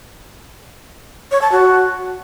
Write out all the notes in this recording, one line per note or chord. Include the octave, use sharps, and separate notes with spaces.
C#5
A5
F#4